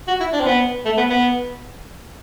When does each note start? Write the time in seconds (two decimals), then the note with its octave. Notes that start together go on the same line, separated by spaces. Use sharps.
0.08 F#4
0.20 E4
0.33 D4
0.41 C4
0.46 B3
0.85 A3
0.97 B3
1.10 B3